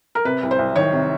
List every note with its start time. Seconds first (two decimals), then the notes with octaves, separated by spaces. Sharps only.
0.15 A#4
0.25 C3 B4
0.43 C2
0.51 C5
0.59 C2
0.76 D#3 C#5
0.93 C3